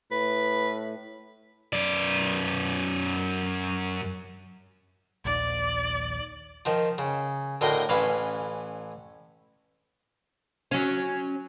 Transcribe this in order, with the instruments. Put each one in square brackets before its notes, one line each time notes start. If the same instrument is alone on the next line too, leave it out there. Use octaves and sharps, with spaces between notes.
[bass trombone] A2 [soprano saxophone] B4
[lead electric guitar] F#2 D5
[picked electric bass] A#1 D#2 D#3 [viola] D5
[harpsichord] D#3 F3
C#3
D2 A2 A#4 D#5 G5 C6
A1 E3 C#4 F5 B5
[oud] F#3 C#4